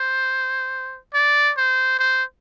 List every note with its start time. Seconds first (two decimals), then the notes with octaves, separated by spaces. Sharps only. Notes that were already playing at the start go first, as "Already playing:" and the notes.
Already playing: C5
1.14 D5
1.57 C5
1.99 C5